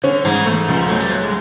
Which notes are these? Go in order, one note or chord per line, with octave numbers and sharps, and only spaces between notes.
D3 C#4
G#2 E3
A3
C#2 F3
F#3 A3
G3
F#3 A3
G#3